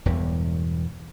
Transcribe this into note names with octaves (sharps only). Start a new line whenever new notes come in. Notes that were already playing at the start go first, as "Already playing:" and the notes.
E1 E2 G2 E3